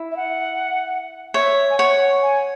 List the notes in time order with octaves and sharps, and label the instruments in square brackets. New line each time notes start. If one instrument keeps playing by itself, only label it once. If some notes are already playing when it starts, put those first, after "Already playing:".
Already playing: [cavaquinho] E4
[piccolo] E5
F#5
[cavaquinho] C#5 [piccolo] E5
[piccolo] G#5
[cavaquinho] C#5 [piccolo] F#5
[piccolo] G#5